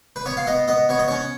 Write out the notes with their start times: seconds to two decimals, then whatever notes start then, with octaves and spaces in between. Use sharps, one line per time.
0.16 B4
0.26 B3 C#5
0.37 F5
0.47 B3 D#5
0.68 B3 D#5
0.89 B3 C#5
0.99 D#5
1.08 C#4 C#5